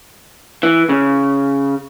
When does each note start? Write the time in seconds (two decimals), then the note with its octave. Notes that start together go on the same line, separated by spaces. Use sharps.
0.63 E3
0.89 C#3